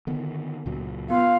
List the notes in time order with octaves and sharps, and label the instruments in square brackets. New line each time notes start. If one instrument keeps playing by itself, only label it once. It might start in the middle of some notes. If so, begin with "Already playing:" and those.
[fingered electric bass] D3 D#3 B3
C#2 A#2 F#3
[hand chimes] B3 F4 C6 [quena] F5